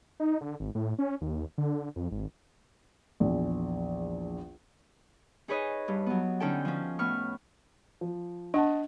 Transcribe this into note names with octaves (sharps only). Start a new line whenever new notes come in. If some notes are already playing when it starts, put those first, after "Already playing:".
D#4
D3
G#1
A2
C#4
D#2
D3
F2
G#1
A#1 E2
D#4 G#4 B4 C#5 D#5
G2
F#3 B3
D3 C#4 D#4 A4 G5
F3 C#4
A2 B3 C#6 F6
F3
D4 D#5 F#5 A5